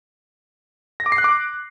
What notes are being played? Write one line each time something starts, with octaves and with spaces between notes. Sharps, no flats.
A#6
D6
C7
F#6
D6